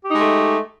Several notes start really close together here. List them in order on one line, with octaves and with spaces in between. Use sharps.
G4 D#4 G#3 A3